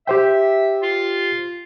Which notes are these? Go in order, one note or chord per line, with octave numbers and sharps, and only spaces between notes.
G4 C5 E5 G5
F4